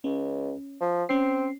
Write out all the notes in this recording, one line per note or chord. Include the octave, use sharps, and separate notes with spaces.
C#2 C#4
F3
C4 C#4 C7